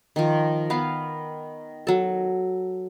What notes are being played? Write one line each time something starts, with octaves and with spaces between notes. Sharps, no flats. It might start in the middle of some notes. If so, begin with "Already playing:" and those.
D#3 F3
B3 B4 F5
F#3 A4